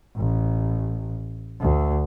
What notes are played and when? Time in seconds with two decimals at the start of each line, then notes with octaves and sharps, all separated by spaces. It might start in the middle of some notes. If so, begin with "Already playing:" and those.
0.16 A1
1.61 D2